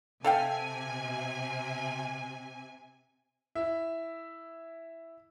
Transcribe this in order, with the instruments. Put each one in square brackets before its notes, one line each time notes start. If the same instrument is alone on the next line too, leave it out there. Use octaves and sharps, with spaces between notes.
[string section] C3 G#5 [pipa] A4 F5 G5
[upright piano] E4 E5